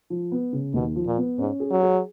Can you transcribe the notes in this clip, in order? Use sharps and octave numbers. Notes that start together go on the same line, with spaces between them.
F3
B3
C#3
D#2 B2
F3
A#2
B3
G#2 C#4
G#4
F#3
G#4